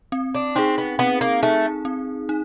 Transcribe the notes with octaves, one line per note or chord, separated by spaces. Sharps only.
C4
D4
C4 D#4 G#4
B3
B3 C4
A#3
A3 D#4 G#4
C4
D#4